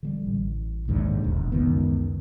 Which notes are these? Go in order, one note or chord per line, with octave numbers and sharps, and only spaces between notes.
D3 F#3 G3
A1
A#1 D#2 G#2 D3
E1 A#1
C#2 F#2 D#3 B3